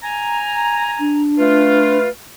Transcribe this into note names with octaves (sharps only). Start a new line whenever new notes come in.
G#5 A#5
D4
A3 F4 B4